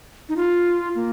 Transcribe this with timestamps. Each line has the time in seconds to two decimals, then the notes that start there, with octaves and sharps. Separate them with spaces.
0.29 D#4
0.36 F4
0.95 A#3